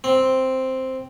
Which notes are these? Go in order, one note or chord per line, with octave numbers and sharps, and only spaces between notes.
C4